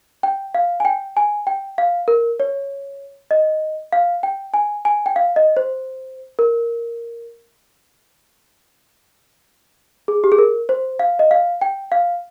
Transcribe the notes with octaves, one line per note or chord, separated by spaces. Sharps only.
G5
F5
G#5
G5
G#5
G5
F5
A#4
C#5
D#5
F5
G5
G#5
G#5
G5
F5
D#5
C5
A#4
G#4
G4
G#4
A#4
C5
F5
D#5
F5
G5
F5